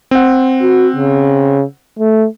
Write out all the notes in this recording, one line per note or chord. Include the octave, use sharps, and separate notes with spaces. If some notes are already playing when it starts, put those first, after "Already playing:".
C4 F#5
F#4
C#3
A3